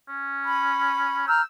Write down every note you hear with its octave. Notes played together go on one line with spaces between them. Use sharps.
C#4
B5
A#5 E6 F6 G6